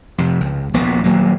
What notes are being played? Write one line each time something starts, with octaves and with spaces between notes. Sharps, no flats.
F2 C3
C#2
D#1 A#1 A#2 B3
D#1 F#3 A#3